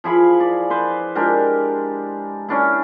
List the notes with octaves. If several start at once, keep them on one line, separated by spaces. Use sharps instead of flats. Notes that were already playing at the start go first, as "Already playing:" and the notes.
F3 E4 G#4 B5
D5
B4 C5
G#3 D4 G4 A#4
C#4 D4 E4